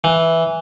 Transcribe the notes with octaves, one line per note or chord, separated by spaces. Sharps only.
E3